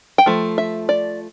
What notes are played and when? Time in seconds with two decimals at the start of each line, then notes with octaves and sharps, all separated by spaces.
0.18 G5
0.26 F3 A3
0.58 E5
0.89 D5